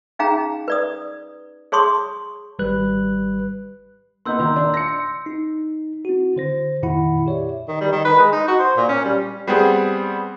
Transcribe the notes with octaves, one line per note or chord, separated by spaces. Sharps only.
C#4 D#4 G#4 F5 G5 A#5
B4 D5 D#6
G#4 C#5 A5 C6 C#6 D#6
G#1 G3 B4 F#6
A#3 B3 D#4 C6 E6 G6
A#2 D#3
D4
A#6 C#7
D#4
C4 E4 F#4
D3 C5 A#6
F2 A#2 D#3 E4 F#5 B5
G4 C#5 D5 E5
D#3
G3
D#3
B4
G#3
D#4
F#4
C5
A#2
C#4
G3
G3 B3 C4 G#4